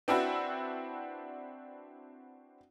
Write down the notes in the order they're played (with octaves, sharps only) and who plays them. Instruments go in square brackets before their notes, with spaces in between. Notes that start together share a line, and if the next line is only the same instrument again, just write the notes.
[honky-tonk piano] C4 D4 E4 F#4 B4